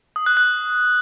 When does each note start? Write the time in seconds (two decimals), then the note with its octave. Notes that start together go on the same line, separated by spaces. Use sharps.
0.16 D#6
0.26 F#6
0.37 F#6